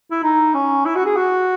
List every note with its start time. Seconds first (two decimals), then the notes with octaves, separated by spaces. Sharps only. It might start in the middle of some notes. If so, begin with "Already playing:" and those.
0.11 E4
0.23 D#4
0.54 C#4
0.86 E4
0.96 F#4
1.05 G#4
1.16 F#4